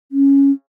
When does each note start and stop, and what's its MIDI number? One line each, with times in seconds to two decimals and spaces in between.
0.12 0.51 61